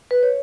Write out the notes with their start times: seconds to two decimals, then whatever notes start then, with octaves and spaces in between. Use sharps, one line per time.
0.11 B4
0.23 C#5